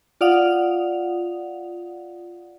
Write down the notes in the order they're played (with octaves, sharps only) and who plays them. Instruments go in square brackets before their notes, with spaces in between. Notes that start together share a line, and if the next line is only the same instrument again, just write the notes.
[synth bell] F4 D5 F5 F#5 D#6 F7